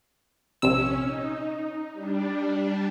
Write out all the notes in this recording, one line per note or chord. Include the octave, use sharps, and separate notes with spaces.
A#1 C3 C#4 E6
D#4
G3 D4